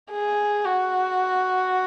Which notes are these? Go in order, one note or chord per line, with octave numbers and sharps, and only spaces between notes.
G#4
F#4